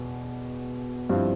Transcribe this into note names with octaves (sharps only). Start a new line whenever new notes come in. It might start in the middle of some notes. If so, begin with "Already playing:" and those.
Already playing: E2 B2 B3
G2 F3 C4 E4